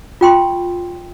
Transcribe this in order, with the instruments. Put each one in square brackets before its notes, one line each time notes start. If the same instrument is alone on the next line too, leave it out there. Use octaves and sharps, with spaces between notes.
[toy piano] F4 G5 C6 C#6